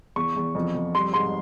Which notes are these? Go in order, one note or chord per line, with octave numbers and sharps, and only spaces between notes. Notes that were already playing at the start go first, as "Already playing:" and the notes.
E2 C#6
E2
F2
F2
G3 C6
G#2 C6